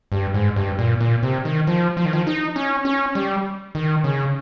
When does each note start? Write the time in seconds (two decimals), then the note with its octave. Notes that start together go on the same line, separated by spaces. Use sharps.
0.12 G2
0.34 G#2
0.56 G2
0.79 A#2
1.01 A#2
1.23 C3
1.45 D#3
1.67 F3
1.97 F3
2.05 D#3
2.13 F3
2.27 D#4
2.56 C#4
2.85 C#4
3.15 G3
3.75 D#3
4.04 C#3